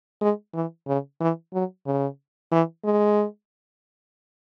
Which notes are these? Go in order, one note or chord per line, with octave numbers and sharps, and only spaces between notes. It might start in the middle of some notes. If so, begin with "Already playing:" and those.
G#3
E3
C#3
E3
F#3
C#3
E3
G#3